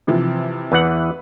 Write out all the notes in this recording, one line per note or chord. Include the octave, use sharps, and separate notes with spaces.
C3 E3 F3
E2 E3 B4 F#5